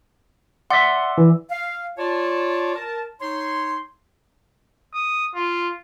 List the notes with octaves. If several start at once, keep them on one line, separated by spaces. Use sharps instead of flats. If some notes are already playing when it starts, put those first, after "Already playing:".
D5 E5 F#5 C6
E3
F5
F4 C#5 D5 A5
A#4 A5
D#4 C#5 C6
D#6
F4